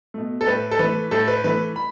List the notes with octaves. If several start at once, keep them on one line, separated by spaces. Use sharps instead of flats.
B2 A3
A4
A2 B4
A4
E3 A3 B4
A2 A4
B4
E3 A3 B4
B5